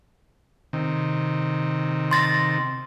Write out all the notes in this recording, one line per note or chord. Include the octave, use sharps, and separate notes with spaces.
C3 D#3
C6 A6 A#6